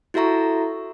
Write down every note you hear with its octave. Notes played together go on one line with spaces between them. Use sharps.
E4 F#4 A4 E5 A#5 C#6